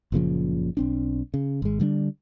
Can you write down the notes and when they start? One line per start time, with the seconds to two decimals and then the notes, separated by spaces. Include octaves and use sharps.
0.12 F#1 A#2 C#3 F3
0.77 B1 C4 D4
1.34 C#3
1.62 G#1 G#3
1.80 D3 G3 G#3 D4